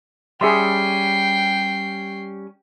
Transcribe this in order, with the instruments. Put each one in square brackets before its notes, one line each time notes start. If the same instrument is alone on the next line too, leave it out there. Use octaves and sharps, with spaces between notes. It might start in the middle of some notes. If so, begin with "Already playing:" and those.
[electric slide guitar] G3 C#4 [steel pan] G#4 E5 C6 [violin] G5 C7